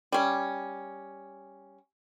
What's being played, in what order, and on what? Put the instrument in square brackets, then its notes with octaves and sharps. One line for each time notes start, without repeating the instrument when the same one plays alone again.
[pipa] G3 C#4